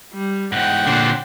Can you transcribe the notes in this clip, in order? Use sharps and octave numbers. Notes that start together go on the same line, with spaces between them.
G3
E2 G#2 F#5 G5
A#2 D3 D4 C5